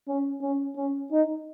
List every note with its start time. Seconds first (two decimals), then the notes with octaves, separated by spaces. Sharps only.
0.08 C#4
0.42 C#4
0.76 C#4
1.11 D#4